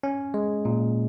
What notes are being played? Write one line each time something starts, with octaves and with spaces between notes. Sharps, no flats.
C#4
G#3
A#2